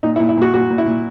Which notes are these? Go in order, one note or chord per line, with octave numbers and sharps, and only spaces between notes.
A#2 D#4
E4
A#2
E4
A#2 F#4
A#2 F#4
A#2
E4
A#2